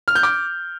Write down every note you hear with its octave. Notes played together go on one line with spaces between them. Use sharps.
F6
G6
D6